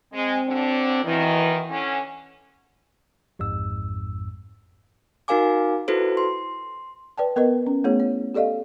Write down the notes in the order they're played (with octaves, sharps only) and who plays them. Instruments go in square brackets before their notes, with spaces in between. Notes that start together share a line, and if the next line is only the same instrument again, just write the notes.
[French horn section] G#3 [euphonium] C4
[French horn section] D3 F#3 D4
[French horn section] B2 D#3 [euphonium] E3
[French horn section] D3 C#4
[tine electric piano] A1 F2 G#2 E6
[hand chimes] D#4 F#4 A#4 F5 G#5 D6
E4 F#4 A4 B4 C5
C6
[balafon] B4 D5 G5 A5
B3 A#4 B4 D#5
C#4
A3 B3 E4 G#4 C#5
C#5
G4 A4 D5 D#5 F5